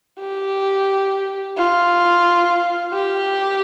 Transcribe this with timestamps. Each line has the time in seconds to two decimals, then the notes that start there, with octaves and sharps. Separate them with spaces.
0.20 G4
1.57 F4
2.93 G4